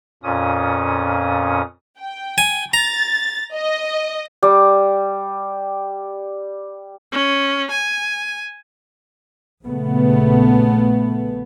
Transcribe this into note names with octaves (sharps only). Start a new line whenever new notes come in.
F2 A#2 C#4 D#6
G5
G#5
A#5 A6
D#5
G3 G4
C#4
G#5
A#1 C#3 A3 B3